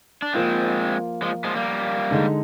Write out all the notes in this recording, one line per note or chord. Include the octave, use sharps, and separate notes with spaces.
D4
F3 G#3 A#3 C4 F4
F3 G#3
F3 G#3
G3 A#3
D3 G#3 D#4